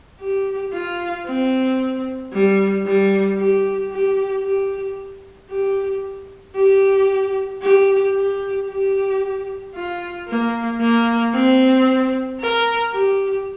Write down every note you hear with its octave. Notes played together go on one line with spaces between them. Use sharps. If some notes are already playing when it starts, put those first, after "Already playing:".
G4
F4
C4
G3
G3
G4
G4
G4
G4
G4
G4
G4
G4
F4
A#3
A#3
C4
A#4
G4